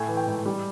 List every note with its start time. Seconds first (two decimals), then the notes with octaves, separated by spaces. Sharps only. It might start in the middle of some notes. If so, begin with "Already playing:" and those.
Already playing: A2 A3 G#5
0.08 E3
0.17 G5
0.27 G#2
0.46 G3